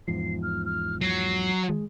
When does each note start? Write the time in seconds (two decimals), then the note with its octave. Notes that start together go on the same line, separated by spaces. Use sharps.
0.08 E2 G#2 F3 C7
0.43 F6
0.65 F6
1.01 F#3 C7
1.70 G#3